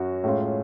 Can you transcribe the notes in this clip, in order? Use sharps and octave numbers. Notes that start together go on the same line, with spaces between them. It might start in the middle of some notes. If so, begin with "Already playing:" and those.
Already playing: F#2 F#3 C#4 F#4
A2 G#3 C#4 F4